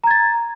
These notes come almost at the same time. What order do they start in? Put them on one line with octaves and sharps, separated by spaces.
A#5 G#6 A6